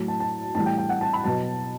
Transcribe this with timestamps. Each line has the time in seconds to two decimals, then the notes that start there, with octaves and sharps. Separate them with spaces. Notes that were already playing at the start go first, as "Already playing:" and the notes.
Already playing: A2 F#3
0.08 A5
0.20 A5
0.55 A2 E3 G3 A5
0.66 G5
0.78 G5
0.89 F#5
1.01 A5
1.13 B5
1.24 B2 F#3 A5